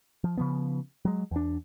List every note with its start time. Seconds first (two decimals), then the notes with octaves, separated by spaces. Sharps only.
0.24 F3
0.38 C#3 F3 B3
1.05 F#3 G#3
1.31 E2 D4